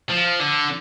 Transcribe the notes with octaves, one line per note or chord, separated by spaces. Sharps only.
F3
D3